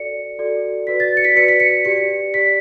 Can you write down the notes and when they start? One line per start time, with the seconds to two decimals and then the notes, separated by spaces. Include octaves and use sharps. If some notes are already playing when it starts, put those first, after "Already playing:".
Already playing: F#4 A4 D5 C#7
0.39 F#4 A4 D5
0.87 F#4 B4 D5 B6
1.00 A6
1.17 C#7
1.25 B6
1.36 F#4 B4 D5 C#7
1.48 B6
1.60 C#7
1.85 G4 D5 C#7
2.34 G4 D5 B6